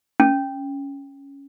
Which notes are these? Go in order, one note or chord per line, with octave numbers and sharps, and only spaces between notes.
C#4